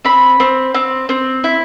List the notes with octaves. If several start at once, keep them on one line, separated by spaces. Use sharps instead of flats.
C4 B5
C4
C4
C4
E4